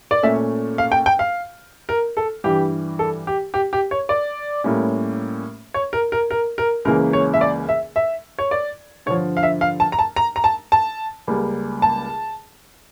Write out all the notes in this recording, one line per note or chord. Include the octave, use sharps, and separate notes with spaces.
D5
A#2 A3 C#4 E5
F5
G5
G5
F5
A#4
A4
G2 E3 G3 G4
A4
G4
G4
G4
C#5
D5
A2 G3 A#3 C#4
C#5
A#4
A#4
A#4
A#4
C#2 C#3 E3 A#3 C#4 A#4
C#5
E5
D5
E5
E5
C#5
D5
G2 D3 F3 C#5
F5
E5
F5
A5
A#5
A5
A#5
A#5
A5
A5
C#2 C#3 G3 A#3
A5